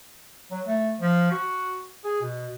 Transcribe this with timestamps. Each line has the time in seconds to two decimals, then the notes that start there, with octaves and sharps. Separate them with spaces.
0.51 F#3
0.67 A3
1.01 F3
1.31 F#4
2.04 G#4
2.21 B2